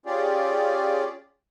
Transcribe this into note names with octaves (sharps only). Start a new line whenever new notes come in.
C#4 F4 G4 G#4 D5